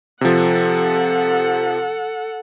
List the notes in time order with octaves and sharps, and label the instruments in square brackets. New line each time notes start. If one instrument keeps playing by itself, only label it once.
[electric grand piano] C3 F3 [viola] A4 F#5